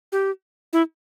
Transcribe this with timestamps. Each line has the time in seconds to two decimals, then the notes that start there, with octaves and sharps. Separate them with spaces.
0.12 G4
0.73 E4